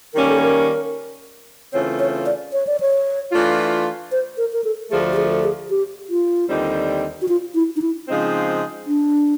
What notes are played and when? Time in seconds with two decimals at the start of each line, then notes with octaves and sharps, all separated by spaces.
0.14 D#3 G3 A#3 C#4 A#4
0.29 A4
0.42 A#4
1.73 C#3 E3 A3 C4 F4 C#5
1.99 C#5
2.26 D5
2.53 C#5
2.67 D5
2.80 C#5
3.32 E3 A3 D4 F4
4.12 C5
4.37 A#4
4.53 A#4
4.64 A4
4.91 D2 D3 F3 A3 G#4
5.13 G4
5.16 G#4
5.43 G#4
5.70 G4
6.09 F4
6.49 D#2 D3 G3 C4 D#4
7.22 F#4
7.28 F4
7.54 E4
7.76 D#4
7.82 E4
8.08 C#3 F3 G#3 C4 D#4
8.87 D4